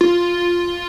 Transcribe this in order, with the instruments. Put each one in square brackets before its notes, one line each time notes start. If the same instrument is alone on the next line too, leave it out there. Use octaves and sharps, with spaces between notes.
[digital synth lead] F4